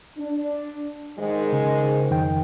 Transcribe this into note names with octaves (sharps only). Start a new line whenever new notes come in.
D4
G#2 D#3 G#3
C#3
F2 D#3 G5